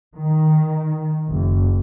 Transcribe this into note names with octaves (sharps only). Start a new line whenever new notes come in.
D#3
F#1